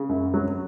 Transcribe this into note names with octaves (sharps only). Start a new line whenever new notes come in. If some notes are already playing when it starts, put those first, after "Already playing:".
Already playing: C#3
F#2
F#3